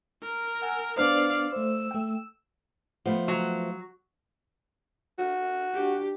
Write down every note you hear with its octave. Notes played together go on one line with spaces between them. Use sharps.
A#4
F#5 G#5 E6
B3 D4 C5 D5 F5
A3 C5 E6
A3 G5
F3 A3 B3
F#3
F#4
D4 G4